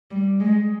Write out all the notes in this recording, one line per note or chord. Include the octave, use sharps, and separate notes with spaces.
G3
G#3